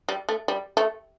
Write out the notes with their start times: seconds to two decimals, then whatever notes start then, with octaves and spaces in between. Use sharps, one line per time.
0.09 G3
0.29 A3
0.48 G3
0.77 A3